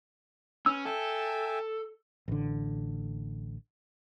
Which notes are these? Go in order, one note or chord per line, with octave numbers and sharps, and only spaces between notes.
C#4 B4 E6
A4 E5 G5 G#5
A1 D3